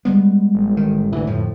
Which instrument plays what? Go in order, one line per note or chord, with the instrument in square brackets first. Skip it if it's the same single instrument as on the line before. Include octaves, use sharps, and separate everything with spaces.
[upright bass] G3 G#3 [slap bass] B3
[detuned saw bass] A1
[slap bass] D#3
[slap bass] G#1 D2 [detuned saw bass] E3
[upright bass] F2 D3 [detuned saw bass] A2 [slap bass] F3